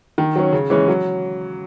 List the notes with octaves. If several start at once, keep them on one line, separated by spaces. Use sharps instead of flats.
D#3
F#3 C#4
C#3
E3 G#3 C#4
F#3